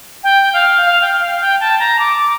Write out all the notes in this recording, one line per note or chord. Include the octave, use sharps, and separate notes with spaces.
G5
F5
F5
G5
F5
G5
A5
A#5
D6